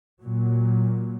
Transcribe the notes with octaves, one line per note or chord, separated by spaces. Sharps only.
A#2 F#3